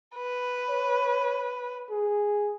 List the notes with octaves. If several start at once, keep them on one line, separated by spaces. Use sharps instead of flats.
B4
C#5
G#4